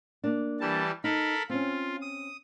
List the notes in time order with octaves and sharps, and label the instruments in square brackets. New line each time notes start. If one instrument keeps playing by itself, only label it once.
[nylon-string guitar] A#3 D4
[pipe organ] E3 G3 A5
[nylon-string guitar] D#4 [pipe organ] A4 A#4 B5
[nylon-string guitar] C4 C#4 [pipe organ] F4
[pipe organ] D#6